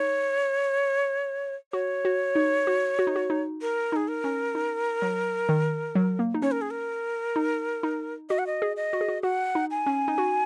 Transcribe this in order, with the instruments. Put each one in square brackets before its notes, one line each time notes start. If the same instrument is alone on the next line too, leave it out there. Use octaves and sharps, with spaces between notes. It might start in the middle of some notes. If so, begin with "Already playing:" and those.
Already playing: [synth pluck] D#4 [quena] C#5
[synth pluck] F#4 [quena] C#5
[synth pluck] F#4
D#4
F#4
F#4
D#4
F#4
D#4
[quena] A#4
[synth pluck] D#4 [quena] G#4
[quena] A#4
[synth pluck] C#4
D#4
F#3
D#3
F#3
A#3
D#4
[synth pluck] C#4 [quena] C#5
[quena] A#4
G#4
A#4
[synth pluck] D#4
D#4
[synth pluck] F#4 [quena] D#5
[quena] F#5
D#5
[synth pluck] G#4
[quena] D#5
[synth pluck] F#4
G#4
F#4
[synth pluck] F#4 [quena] F#5
[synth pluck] D#4
[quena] G#5
[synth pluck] C#4
D#4
F#4